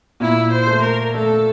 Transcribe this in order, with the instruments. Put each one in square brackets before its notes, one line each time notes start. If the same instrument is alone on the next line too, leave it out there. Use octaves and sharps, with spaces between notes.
[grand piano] A#2 [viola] E4
[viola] C5
[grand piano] A3
[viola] A#4
[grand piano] A3 [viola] A4